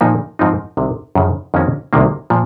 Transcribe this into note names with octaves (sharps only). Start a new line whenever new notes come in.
A#2 F3 A#3 D#4
G#2 F3 C4 D#4
C2 C3 D#3
F#2 C#3 F3
F2 D#3 A#3 C#4 F#4
C2 C3 D#3 A#3
A#2 F3